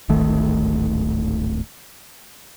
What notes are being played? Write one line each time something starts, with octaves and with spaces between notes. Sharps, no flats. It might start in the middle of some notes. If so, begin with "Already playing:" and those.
D1 G#1 D#3 A3